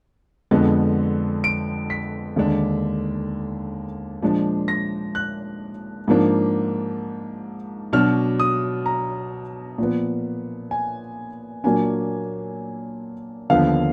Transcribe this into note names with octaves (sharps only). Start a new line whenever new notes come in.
F2 D3 G#3 B3
D7
B6
D#2 D3 G#3 D4
A#2 F3 G#3 D4
A#6
F#6
G#2 F3 A#3 D4
B2 F#3 D4 F6
D#6
A#5
A#2 F3 B3
G#5
A#2 F#3 A#3 D4 G#5
D#2 D3 F3 B3 F5